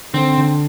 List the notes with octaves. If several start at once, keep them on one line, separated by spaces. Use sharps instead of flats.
D3 C4
D3